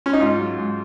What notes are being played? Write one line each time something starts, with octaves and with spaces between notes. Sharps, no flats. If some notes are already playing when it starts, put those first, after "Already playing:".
C#4
D#4
G#2 F4
F#3
G#2